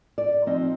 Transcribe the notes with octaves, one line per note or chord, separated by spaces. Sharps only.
D5
F3 C4 D#4 D#5